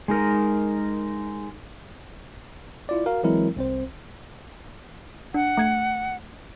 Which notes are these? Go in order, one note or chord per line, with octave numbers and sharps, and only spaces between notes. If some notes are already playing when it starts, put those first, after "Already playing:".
G#3 D#4 A#4
E4 F4 D5
F#4 A#4 F5
E3 F#3 G#3 C4 E4 A#4
C2 C4 C5
D4 F#5
A3 G#6 C#7